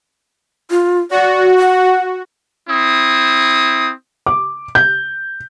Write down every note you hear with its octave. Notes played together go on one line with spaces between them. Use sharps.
F4
F#4 D5
F#5
C4 E4 D#6
D6
G6